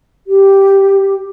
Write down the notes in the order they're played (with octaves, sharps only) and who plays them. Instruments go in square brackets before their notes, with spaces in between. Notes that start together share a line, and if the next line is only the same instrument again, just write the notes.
[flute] G4